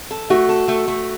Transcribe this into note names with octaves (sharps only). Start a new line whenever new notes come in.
A4
A3 F#4
A4
A3
A3